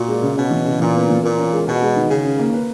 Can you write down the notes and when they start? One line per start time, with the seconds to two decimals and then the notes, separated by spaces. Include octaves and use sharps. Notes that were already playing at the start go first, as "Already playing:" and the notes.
Already playing: A#2 F#4
0.08 G#3
0.22 C#3
0.37 B2 C#4
0.51 E3
0.66 C#3
0.80 A#2 E3
0.95 B3
1.09 E3
1.23 A#2 A#4
1.37 C#4
1.53 G#3
1.67 B2 G#4
1.82 G#3
1.96 D#3
2.11 C#3 G#4
2.25 C#4
2.39 A#3
2.54 B4